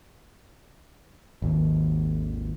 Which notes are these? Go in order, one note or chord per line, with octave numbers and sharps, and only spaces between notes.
G#1 D#2